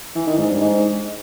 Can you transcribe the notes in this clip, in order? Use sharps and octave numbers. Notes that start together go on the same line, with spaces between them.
E3
D#3
G#2
G2
G#2